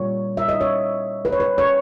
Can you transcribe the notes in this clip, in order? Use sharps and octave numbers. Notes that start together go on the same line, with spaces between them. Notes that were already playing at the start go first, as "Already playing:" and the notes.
Already playing: A#2 G3 A#3 C#5
E5
D#5
C#5
B4
C#5
B4
C#5